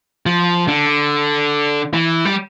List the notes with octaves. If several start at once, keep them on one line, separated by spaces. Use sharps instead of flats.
F3
D3
E3
G3